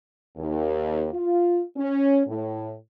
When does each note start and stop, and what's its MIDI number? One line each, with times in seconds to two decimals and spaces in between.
0.37 1.06 39
1.13 1.60 65
1.76 2.21 61
2.27 2.73 45